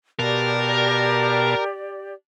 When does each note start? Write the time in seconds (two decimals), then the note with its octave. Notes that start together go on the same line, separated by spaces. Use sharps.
0.19 B2 G4 A#4 D5 F5 A5